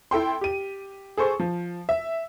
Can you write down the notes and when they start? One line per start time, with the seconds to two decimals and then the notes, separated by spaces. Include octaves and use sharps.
0.11 E4 A4 G5 C6
0.41 G4 D#7
1.17 G#4 A4 C5 C#6
1.40 F3
1.89 E5